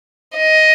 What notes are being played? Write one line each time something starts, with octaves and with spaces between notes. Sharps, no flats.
D#5